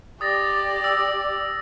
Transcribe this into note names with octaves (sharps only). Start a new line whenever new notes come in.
G4 D5 D#6 A6 A#6
E6